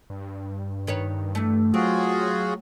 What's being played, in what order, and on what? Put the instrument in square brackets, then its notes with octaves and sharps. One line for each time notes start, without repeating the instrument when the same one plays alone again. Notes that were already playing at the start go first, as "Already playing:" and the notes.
[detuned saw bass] G2
[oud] D#3 B4 C#5
E3 A3
[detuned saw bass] F#3 [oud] C4 [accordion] F4 F#4 G#4